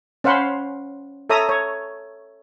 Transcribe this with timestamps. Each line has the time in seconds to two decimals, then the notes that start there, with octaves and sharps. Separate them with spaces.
0.24 C#4 C5 F5 F#5 B5 C6
1.30 A4 C#5 E5 A#5 D#6
1.49 C#5